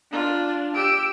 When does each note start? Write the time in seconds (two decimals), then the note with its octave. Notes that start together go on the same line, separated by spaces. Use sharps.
0.12 D4 F4
0.75 G4 E6 D7